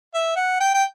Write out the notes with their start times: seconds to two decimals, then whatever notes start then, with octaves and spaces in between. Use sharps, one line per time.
0.14 E5
0.36 F#5
0.60 G5
0.74 G5